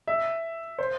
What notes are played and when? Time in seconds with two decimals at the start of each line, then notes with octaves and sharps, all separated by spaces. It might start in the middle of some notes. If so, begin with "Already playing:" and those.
0.08 E5
0.79 C5